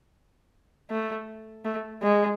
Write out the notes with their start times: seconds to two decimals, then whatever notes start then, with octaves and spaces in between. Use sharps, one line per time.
0.90 A3
1.65 A3
2.02 G#3